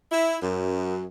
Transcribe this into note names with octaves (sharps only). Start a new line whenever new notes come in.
E4
F#2